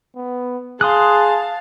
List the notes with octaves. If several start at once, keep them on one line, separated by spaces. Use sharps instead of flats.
B3
G#4 F5 A5 C6 D#6 F#6